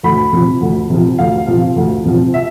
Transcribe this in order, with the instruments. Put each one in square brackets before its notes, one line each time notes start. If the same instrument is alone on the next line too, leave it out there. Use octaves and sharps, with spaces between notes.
[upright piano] D2 B5
C3 F3
D2
C3 F3
D2 F5
C3 F3
D2
C3 F3
E5